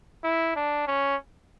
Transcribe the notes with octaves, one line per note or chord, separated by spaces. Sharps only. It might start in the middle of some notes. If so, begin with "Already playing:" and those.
E4
D4
C#4